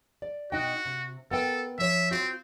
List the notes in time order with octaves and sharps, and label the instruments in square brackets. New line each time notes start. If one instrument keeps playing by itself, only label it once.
[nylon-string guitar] D5
[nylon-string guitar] B2 D#4 G5 [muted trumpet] F#4
[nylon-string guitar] C3
[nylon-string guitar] B3 A#4 G5 [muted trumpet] A4
[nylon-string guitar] F3 C#5 [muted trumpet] E5
[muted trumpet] C4 [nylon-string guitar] F4 F#4